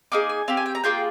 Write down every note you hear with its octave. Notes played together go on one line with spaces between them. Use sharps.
A#3 D#4 G#4 D6
G#5
C4 G4 F5
G#5
G5
A#5
A#3 F4 G#4 G5